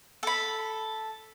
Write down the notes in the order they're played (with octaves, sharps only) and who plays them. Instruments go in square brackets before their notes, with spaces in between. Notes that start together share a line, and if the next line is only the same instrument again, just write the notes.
[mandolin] A4 B5